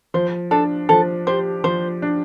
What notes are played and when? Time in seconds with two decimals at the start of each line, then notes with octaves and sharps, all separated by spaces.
0.14 F3 C5
0.51 D4 A4
0.89 F3 A4
1.27 G4 C5
1.64 F3 C5
2.02 D4